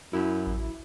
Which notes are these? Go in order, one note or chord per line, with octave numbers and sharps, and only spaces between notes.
F#2 E4
A1